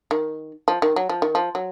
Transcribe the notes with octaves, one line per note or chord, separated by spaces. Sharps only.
D#3
F3
D#3
F#3
F3
D#3
F3
F#3